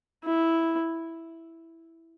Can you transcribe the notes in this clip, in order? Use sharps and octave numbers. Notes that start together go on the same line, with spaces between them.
E4